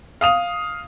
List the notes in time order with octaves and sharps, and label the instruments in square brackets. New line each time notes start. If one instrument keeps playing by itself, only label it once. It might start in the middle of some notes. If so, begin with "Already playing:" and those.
[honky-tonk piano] F5 D#6 F7